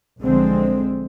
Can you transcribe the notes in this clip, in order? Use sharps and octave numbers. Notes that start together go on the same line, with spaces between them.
B1 D3 F3 G#3 C4